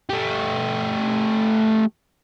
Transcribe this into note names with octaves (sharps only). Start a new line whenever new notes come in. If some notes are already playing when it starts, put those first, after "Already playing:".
A3 G4